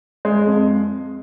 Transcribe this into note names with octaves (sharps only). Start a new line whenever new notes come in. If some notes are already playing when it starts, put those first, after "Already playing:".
G#3
F2